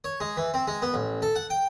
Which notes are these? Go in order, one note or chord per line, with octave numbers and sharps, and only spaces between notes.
C#5
G#3
E3
C4
G#3
B3
A1
A4
F#5
G5